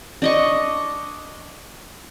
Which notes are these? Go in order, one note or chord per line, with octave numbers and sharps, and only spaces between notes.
D4 D#5 C#6